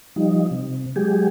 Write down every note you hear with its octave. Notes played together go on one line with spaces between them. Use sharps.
F3 G3 D#4
C3
F#3 G#3 G4 G#4